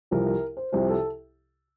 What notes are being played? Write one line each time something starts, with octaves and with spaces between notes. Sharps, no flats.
C2 C3 F3 A#4
A#4
C5
C2 C3 F3 C5
A4